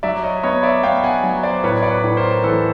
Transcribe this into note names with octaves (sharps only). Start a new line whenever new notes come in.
F#3 D5 E5
C#5 D#5
B3 C#5 D#5
D5 E5
B3 F5 G5
F#5 G#5
F#3
C5 D5
A2 B4 C#5
D5
B4 C#5
A2
A#4 C5
E3 A4 B4